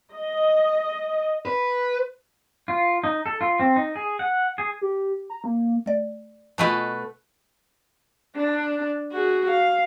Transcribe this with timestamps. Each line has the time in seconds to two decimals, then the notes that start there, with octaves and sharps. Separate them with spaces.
0.13 D#5
1.45 B4
2.68 F4
3.04 D#4
3.26 A4
3.41 F4
3.60 C4
3.76 D#4
3.96 G#4
4.19 F#5
4.58 G#4
4.81 G4
5.30 A#5
5.44 A#3
5.86 A3 D5
6.58 B2 A3 F4 B4 D#5 G#5
8.35 D4
9.12 F#4 G#4
9.50 F5